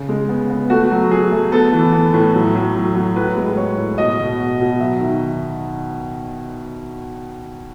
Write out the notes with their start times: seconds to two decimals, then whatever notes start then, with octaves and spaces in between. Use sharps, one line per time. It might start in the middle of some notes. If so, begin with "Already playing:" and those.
Already playing: C#3
0.09 G#3
0.29 B3
0.50 B3
0.70 A3 F#4
0.91 F#3
1.11 F#3 G#4
1.32 A3
1.52 B3 A4
1.73 E3
1.93 B3
2.14 A2
2.34 F#3
2.55 A2
2.75 F#3
2.95 F#3
3.16 A2 B4
3.37 G#3
3.57 G#3 C#5
3.77 A2
3.98 B2 D#5
4.19 B2
4.39 B2
4.60 B2
4.80 F#3 E5
5.00 D#3